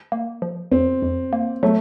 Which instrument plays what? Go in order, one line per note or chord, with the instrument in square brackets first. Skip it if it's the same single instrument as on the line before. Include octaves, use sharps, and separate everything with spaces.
[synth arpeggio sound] A#3
F3
[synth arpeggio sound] F2 [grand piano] C4
[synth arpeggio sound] F2
A#3
[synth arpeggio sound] F#3 [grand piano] A3